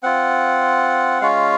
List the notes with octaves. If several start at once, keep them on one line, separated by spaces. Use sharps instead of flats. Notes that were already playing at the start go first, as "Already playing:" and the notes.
C4 F4 F#5
G#3 C#4 F4 F5